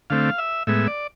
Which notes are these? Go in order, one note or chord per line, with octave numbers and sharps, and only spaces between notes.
D3 A3 C4 F5
E5
A2 G#3 B3 E5
D5